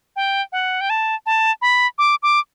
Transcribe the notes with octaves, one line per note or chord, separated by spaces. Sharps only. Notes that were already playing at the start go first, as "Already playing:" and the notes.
G5
F#5
G5
A5
A5
B5
D6
D6